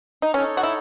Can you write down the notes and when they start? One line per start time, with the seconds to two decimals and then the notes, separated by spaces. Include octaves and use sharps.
0.22 D#4
0.34 C#4 D#4 A4 C#5
0.57 F#4
0.63 E4